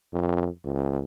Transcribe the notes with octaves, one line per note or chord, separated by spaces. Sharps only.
F2
C#2